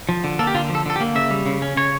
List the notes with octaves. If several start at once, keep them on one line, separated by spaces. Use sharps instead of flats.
F3
D3
A#3 A4
G4
D3 F4
F3
A4
D3 A4
G4
A#3
C#3 E5
G3
C#3
C#4
C#3 C#5